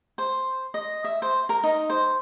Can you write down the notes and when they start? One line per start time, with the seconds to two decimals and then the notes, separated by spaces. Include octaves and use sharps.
0.18 C5
0.74 D#5
1.04 E5
1.22 C5
1.49 A#4
1.63 D#4
1.90 C5